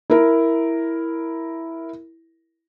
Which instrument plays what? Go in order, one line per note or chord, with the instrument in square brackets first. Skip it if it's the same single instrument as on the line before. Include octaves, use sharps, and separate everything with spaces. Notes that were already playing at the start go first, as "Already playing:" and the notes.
[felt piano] E4 A#4